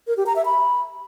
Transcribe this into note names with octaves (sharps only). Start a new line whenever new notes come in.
A#4
G4
A#5
E5
B5